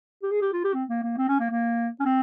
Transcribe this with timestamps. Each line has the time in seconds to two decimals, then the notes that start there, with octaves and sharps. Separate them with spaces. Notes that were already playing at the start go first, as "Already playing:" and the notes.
0.23 G4
0.31 G#4
0.42 G4
0.53 F4
0.64 G4
0.74 C4
0.89 A#3
1.03 A#3
1.18 C4
1.29 C#4
1.40 A#3
1.51 A#3
2.00 C#4
2.05 C4